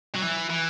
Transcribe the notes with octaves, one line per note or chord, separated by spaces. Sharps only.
F#3
E3
E3